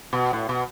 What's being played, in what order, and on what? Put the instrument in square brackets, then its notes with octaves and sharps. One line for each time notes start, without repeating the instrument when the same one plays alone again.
[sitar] B2
A2
B2